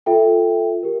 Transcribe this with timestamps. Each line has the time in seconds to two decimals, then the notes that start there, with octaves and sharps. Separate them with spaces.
0.06 F4 A4 E5 G5
0.83 G4 A#4